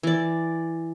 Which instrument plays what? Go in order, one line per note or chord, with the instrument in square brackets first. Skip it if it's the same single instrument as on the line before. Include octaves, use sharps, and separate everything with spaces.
[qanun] E3 D5